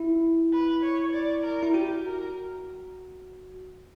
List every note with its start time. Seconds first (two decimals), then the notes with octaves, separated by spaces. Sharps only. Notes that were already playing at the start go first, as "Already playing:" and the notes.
Already playing: E4
0.53 B4
0.83 C#5
1.13 D5
1.44 A#4
1.63 E4
1.74 F#4 G4
2.04 A#4